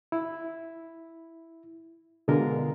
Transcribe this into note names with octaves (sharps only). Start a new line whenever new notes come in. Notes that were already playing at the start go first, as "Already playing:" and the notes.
E4
B2 D3 G#3 F4 A#4